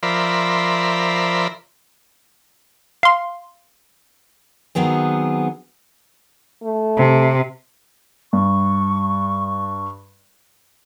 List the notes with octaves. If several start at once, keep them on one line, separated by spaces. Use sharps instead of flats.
F3 A#4 C5 D5 E5 B5
F5 C6
D#3 F#3 B3 C4 G#4
A3
C3
G2 C#6